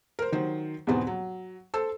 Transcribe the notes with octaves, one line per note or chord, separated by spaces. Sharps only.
A#4 C5
D#3 F#3 C5
E2 G#2 B2 B3 C4
F#3
A4 C5 E6